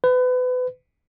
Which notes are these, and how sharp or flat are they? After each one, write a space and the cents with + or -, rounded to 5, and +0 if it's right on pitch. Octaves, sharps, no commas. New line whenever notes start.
B4 +30